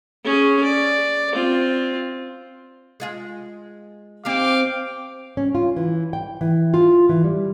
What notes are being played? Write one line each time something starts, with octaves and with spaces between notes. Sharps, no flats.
C#4 G#4
D5
C4 F4
G#3 F4 G#4
C4 D#4 G4 F5 G5 D6
C#4
F4
E3
G5
E3
F4
E3
G3